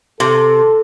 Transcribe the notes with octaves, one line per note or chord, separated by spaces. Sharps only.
C3 A4